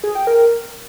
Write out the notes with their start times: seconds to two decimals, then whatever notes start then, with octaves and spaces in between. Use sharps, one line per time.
0.04 G#4
0.15 G5
0.27 A#4